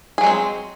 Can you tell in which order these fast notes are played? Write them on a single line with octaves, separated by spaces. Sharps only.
G#4 F#3 G#3 C4